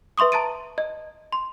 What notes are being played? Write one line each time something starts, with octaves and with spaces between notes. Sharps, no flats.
B4 E5 C6 C#6 D#6
A5 A#5 A6 D7 D#7
D#5
C6